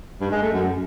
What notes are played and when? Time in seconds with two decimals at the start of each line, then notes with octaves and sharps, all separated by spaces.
0.21 G2
0.31 G#3
0.42 A3
0.52 F#2